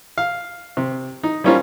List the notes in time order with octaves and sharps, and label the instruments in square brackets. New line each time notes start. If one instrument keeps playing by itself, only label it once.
[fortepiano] F5
C3
D#4
G3 A#3 C#4 D#4 F4 C5